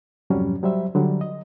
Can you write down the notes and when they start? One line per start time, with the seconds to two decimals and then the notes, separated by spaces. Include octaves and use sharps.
0.30 F2 G#2 C3 F#3 G3 C#4
0.63 F#3 G3 C5 E5
0.95 D3 F#3 G3
1.21 D#5